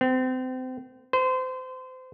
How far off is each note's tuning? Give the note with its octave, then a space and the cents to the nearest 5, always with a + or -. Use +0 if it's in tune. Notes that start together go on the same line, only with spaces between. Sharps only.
C4 -30
C5 -30